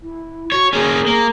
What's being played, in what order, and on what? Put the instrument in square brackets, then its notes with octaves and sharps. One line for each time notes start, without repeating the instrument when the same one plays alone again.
[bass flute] E4
[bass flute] F#4 [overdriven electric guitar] C#5
[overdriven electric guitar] A#3 C#4 [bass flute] G#4
[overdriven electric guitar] A#3